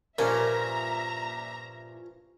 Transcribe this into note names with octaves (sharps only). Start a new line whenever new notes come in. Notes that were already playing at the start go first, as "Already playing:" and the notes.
G2 A#2 F3 C#4 A#4 E5 A#5